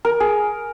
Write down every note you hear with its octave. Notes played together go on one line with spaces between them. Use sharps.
A#4
G#4